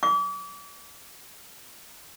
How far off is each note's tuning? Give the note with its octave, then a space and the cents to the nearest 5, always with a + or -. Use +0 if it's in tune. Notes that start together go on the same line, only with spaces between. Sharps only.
D6 -40